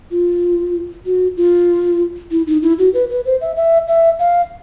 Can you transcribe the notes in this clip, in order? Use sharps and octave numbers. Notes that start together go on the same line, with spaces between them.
F4
F#4
F4
E4
D#4
E4
F#4
B4
B4
C5
E5
E5
E5
F5